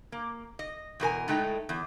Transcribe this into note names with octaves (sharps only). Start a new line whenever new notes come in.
A#3
D#5
E2 B2 A#4 G#5
A2 G#3 A3 D#4 G5
E2